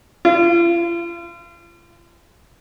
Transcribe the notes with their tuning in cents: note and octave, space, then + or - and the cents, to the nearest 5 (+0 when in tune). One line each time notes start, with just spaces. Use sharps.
F4 -40